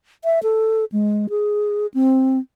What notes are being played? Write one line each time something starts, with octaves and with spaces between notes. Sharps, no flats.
E5
A4
G#3
G#4
C4